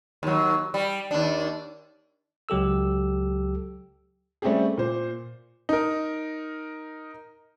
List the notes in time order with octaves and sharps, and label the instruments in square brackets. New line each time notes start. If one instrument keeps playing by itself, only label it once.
[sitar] D#2 F#3
G3
D#2 D4
[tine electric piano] C#2 F#3 G4 A4 E6
[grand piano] G3 A3 C4 C#4 G4 G#4
A#2 C5
[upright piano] D#4 A#4